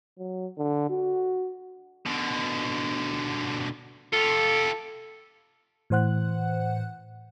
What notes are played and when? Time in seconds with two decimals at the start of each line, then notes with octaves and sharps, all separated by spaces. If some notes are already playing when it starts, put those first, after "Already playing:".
0.18 F#3
0.58 D3
0.89 F#4
2.06 B2 D3
4.13 F4 G4 A4
5.90 A2 E3 C5 F#5 F#6